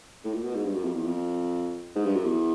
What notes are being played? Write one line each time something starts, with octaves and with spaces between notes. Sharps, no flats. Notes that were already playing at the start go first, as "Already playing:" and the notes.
A2
A#2
B2
G#2
G2
F#2
F2
E2
F2
G#2
G2
F#2
E2